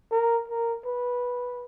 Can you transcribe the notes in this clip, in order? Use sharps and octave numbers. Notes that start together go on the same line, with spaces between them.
A#4
A#4
B4